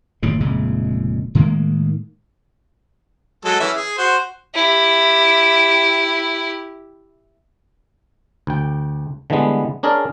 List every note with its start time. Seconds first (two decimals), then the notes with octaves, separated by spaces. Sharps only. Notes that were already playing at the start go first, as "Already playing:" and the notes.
0.22 F#1 D#2 A2 C#3
0.40 F1 A#2 C#3 G#3
1.35 A2 D#3 G#3 A#3
3.45 F#3 G#3 A4
3.60 E3 C#4 E5
3.76 G#4
3.98 F#4 C5
4.55 E4 G4
8.47 D2 G5
9.30 D3 E3 G3 G#3 B3
9.83 C#4 D4 G#4 A#4 D5